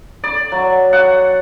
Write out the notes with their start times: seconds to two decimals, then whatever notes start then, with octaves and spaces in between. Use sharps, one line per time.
0.24 D5
0.52 F#3
0.93 F#5